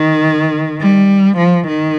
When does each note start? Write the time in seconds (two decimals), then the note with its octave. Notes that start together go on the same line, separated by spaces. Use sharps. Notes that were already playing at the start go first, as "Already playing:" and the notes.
Already playing: D#3
0.81 G3
1.37 F3
1.67 D#3